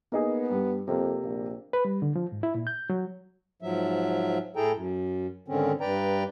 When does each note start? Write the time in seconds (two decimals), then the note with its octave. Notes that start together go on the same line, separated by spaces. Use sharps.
0.12 A#3 B3 D#4 G#4
0.49 G2 G3
0.88 F2 C3 A#3
1.23 A#1
1.73 B4
1.85 G3
2.02 D3
2.16 F3
2.32 G#2
2.43 E4
2.55 A#2
2.67 G6
2.90 F#3
3.62 G#2 F3 F#3 E5
4.56 A2 E4 G#4 A4 G5 A#5
4.74 F#2
5.48 G#2 D3 D#3 C4 C#4
5.81 G2 B4 D5 G5 A#5